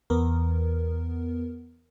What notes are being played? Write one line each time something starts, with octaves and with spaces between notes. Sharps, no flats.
E2 B3 A#4